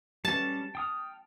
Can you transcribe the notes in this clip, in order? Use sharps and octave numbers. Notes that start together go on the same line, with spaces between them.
G3 C#4 A5
G5 D#6 F6